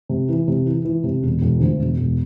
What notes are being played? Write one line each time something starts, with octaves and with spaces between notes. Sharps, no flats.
C3
E3
C3
E3
E3
C3
E1
E1
D2
E1
E1